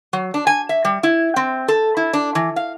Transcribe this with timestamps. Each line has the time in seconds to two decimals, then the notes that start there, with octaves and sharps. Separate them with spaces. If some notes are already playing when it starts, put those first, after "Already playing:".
0.13 F#3
0.34 D4
0.47 G#5
0.69 E5
0.85 G3
1.03 E4
1.36 C4
1.68 A4
1.97 E4
2.13 D4
2.35 E3
2.56 F5